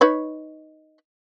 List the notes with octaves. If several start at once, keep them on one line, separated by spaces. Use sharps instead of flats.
D#4 B4 C#5